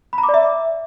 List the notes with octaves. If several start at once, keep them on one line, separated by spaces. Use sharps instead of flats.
B5
A#5
D6
D5
E5